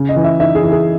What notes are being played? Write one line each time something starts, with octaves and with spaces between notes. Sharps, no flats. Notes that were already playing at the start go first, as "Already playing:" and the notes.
Already playing: C#3
D#5
E3
E5
D#4 E5
G#4
E3
G#4